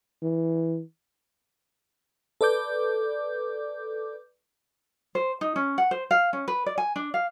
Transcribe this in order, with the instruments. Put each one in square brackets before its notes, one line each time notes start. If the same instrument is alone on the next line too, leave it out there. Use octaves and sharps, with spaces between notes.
[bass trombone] E3
[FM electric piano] A4 B4 D5 D6 G6
[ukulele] C5
D#4
C#4
F#5
C5
F5
C#4
B4
D5
G#5
D4
F5